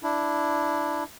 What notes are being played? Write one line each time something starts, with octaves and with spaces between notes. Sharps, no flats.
D4 E4